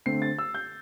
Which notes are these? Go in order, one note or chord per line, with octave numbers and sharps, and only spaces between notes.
D3 A3 C4 C7
A6
E6
G6